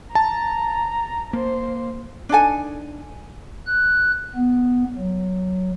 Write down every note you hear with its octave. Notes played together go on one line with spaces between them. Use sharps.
A5 A#5
A#3 C5
D4 D#4 A4 G#5
F#6
B3
F#3